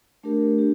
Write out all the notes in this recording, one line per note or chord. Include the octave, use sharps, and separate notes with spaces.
A3 D4 G4 A#4
D4 G4